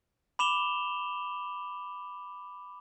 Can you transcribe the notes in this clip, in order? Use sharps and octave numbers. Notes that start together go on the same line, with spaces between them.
B5 D6 E7 F7 G7